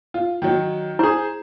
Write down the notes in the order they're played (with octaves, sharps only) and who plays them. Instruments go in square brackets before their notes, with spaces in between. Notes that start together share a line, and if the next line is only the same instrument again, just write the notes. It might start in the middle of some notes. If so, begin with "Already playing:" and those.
[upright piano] F4
D#3 F#3
[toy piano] E4 [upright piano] G#4 C5